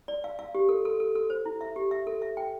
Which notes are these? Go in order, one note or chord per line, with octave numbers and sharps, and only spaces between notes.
D5
F5
F5
G4
A4
A4
A4
A4
C5
E4
E5
G4
E5
A4
E5
G5